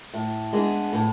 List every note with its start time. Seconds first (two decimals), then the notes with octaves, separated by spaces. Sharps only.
0.13 A2
0.53 G#3 B3 D4 G#4
0.93 A2